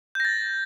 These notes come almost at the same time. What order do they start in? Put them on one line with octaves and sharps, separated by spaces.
G6 A#6 A6